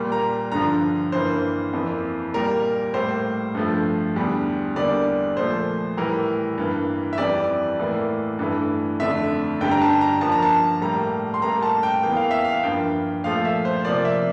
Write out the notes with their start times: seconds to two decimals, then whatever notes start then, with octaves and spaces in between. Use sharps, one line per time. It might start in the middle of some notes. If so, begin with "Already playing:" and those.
Already playing: A#2 G3 A#3
0.12 A#5
0.52 G2 D3 F3 A#5
1.12 G2 E3 A#3 C5
1.73 F2 E3 A#3
2.33 A#2 G3 A#3 A#4
2.94 A2 G3 A#3 C5
3.55 G2 F3 A3
4.16 E2 D3 G3
4.76 E2 D3 G3 A#3 D5
5.37 A#2 F3 A3 C5
5.97 A2 E3 G3 A#4
6.58 G2 E3 A#3
7.13 E5
7.18 F2 E3 G3 D5
7.79 A2 E3 A#3
8.39 G2 E3 A3
9.00 F2 D3 A3 E5
9.61 G2 D3 G3 G5
9.71 A#5
9.81 A5
10.01 A#5
10.21 G2 F3 A#3 A5
10.32 A#5
10.43 A5
10.82 A2 G3 A#3 A#5
11.34 C6
11.42 A2 G3 A#3 A#5
11.62 A5
11.83 G5
12.03 E2 E3 A#3 G5
12.16 F5
12.31 E5
12.45 F5
12.63 G2 F3 A#3 G5
13.24 A#2 F3 A3 F5
13.45 E5
13.65 C5
13.85 C3 F3 A#3 D5
14.05 E5